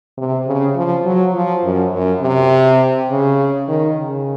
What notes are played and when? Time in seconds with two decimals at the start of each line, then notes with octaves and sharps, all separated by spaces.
0.18 C3
0.47 C#3
0.76 F3
1.05 F#3
1.34 F3
1.64 F#2
1.93 F#2
2.21 C3
3.10 C#3
3.68 D#3
3.97 C#3